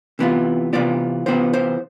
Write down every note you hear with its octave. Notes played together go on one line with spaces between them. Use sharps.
C3 E3 B3 F4
C3 E3 B3 F4 D5
C3 E3 B3 F4 C5
C5